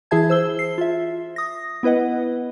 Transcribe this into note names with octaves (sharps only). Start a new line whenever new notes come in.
E3 E4 G#4 E5 A5 G#6
C5 E6 G7
C7
F4 E5
D#6 A#6
B3 E4 B4 D#5 F#5